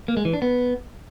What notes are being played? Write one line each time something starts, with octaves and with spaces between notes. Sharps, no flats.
A#3
G#3
E3
D4
B3